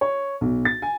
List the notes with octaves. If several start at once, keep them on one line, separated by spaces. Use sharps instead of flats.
C#5
B1
A6
G#5